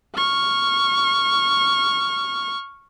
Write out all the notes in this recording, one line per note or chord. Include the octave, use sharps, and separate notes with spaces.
C#6 F6